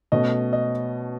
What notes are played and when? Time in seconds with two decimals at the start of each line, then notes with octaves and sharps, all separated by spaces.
0.12 B2 A3 C#4 D#5
0.53 D#5